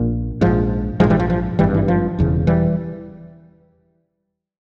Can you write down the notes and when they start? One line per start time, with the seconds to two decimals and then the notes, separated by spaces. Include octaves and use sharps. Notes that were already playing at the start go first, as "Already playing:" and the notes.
Already playing: A#1 A#2
0.41 A#1 G#2 F3
1.00 A#1 G#2 F3 G#3
1.10 E3 G3
1.20 F3
1.30 F3
1.59 G#1 G2 E3 G3
1.74 E3
1.88 F3
2.19 E1 E2 C#3
2.47 E3 G3